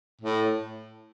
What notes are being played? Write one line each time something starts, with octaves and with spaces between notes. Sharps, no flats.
A2